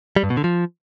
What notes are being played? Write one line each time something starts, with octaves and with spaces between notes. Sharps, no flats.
G3
G2
B2
D3
F3